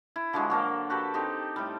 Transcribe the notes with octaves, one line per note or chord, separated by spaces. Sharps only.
E4
D3 F3 F#3 G#3
F#3 A#3 A4 A#4
F#4 G4 A4 B4
C4 D#4 G4 A4
A2 G3